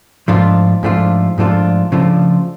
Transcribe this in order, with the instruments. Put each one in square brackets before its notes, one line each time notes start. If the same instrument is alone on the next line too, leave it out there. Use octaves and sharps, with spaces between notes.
[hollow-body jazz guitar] G#2 F3 A3 D4 F4
G#2 F3 A3 D4 F4
G#2 F3 A3 D4 F4
C#3 F3 A3 D4 F4